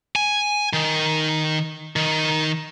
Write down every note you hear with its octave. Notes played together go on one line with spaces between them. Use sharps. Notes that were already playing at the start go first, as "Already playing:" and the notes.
G#5
D#3
D#3